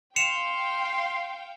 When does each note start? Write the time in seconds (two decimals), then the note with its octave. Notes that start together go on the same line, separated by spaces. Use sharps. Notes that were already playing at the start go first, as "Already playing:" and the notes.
0.16 F5 G5 C6 C#7 E7 F7